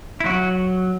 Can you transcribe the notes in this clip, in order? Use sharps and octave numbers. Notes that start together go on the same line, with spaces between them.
E4
F#3 F#4